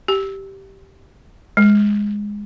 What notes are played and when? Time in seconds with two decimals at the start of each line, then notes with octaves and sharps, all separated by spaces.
0.08 G4
1.57 G#3